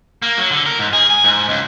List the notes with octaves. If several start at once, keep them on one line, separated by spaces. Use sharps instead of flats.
A#3
F#3
D3
A#4
G#2
G#4
G#5
G#2
C#2